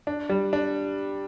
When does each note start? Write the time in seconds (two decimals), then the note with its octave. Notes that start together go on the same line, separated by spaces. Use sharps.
0.07 D4
0.30 G3
0.53 D4